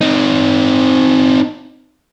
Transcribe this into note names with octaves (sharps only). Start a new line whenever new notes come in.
C4 D#4